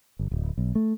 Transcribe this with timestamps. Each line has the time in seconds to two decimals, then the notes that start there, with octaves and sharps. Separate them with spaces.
0.19 G1
0.31 D1
0.58 B1
0.75 A3